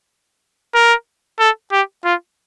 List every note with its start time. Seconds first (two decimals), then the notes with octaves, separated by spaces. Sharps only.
0.74 A#4
1.40 A4
1.72 G4
2.04 F4